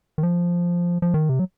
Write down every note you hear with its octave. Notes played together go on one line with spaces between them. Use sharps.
D#3
F3
F3
D#3
C3
F#3